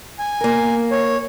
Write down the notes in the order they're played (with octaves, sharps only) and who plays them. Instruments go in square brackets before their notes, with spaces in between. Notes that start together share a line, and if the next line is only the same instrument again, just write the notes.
[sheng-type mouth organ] G#5
[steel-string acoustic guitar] A#3 A#4
[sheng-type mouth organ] C#5